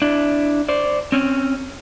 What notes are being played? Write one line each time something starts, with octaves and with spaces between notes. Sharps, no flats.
D4 E4
C5 D5
C4 C#4